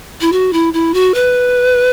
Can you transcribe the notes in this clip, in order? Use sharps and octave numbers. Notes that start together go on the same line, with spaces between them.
E4
F#4
E4
E4
F#4
B4